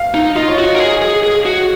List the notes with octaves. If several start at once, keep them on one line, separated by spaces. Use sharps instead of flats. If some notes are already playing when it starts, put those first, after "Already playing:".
Already playing: F5
D#4
F4 D#5
C#5
F#4 D#5
A#4
G#4
G#4
G#4
F#4